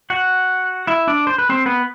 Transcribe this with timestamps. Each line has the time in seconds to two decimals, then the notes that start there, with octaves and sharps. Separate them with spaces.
0.10 F#4 F#5
0.87 E4 E5
1.07 D4 D5
1.27 C5
1.38 B4
1.49 C4 C5
1.66 B3 B4